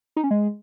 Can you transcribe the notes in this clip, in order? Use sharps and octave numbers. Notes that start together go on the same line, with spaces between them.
D#4
C#4
G#3